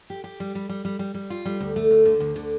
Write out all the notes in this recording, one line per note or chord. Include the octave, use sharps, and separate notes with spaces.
G4
G4
G3
G3
G3
G3
G3
G3
F4
G3
D2
A3
D2
D3
D2
D3